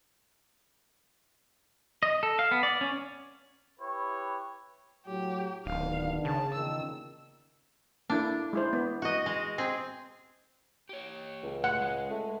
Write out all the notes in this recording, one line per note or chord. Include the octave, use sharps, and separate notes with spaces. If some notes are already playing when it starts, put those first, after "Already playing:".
D#5
A4
F5
B3
D5
C#4
E4 G4 B4 C#5
A2 F#3 G4
D1 D#3 B3 D4 F5
C#3 A5
E2 A#2 D#3 E6
A#3 D4 E4 A4
G#3 E4 C5
B3
F#4 D#5
G#3
C4 G#4
G4 C#5
C#2
A2 F#5
G#3
A3